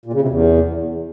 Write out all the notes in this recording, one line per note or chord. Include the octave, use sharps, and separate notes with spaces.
A#2
C#3
C3
E2